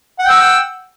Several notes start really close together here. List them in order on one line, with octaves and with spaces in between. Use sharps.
F#5 G5 E6